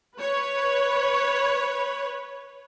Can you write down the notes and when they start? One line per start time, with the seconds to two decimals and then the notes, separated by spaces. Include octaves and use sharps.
0.16 B4 C#5